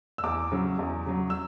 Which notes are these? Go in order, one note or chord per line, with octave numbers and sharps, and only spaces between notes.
E6
E2 D6
C#3 F#3
E2
C#3 F#3
E6